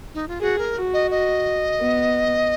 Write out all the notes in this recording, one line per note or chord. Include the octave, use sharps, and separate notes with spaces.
D#4
F4
F#4 G#4
A#4
F#4
D#5
D#5
B3